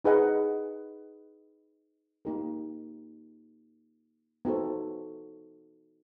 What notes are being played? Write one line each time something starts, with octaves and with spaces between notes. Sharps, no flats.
D#4 G#4 B4 D#5 F#5
A#3 D#4 G4 A#4
B3 D#4 F#4 A4 C5